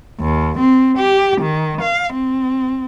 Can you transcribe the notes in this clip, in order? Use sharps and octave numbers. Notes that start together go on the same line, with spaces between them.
D#2
C4
G4
D#3
F5
C4